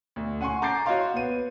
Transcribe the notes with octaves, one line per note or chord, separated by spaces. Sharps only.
D2
C#4 F#5 G#5 C6 C#6
A#5 D6 G6 A6 C7 D7
F#4 C#5 D#5 F5 C6
B3 D#7